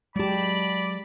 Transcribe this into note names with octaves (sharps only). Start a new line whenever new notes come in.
F#3 G#3 G4 D5 A5 B5